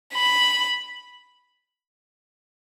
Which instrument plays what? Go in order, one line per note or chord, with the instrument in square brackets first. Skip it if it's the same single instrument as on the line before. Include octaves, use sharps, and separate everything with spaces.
[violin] B5